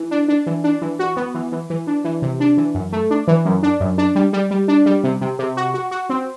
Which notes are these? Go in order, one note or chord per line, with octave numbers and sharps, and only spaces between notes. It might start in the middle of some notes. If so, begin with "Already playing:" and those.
Already playing: E3
D4
D4
E3
D4
E3
F#4
B3
E3
E3
E3
D4
E3
C3
D4
E3
F#2
A3
D4
E3
F#2
D4
F#2
D4
G3
G3
G3
D4
G3
C3
C3
C3
F#4
F#4
F#4
C4